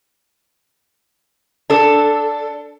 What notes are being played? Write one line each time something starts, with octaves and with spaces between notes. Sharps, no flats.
D4 A4